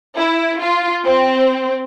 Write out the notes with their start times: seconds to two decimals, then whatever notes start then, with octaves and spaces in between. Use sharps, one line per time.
0.17 E4
0.60 F4
1.04 C4